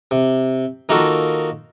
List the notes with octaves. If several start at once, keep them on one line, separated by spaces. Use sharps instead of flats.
C3
D#3 A#3 D#4 F4 F#4 A4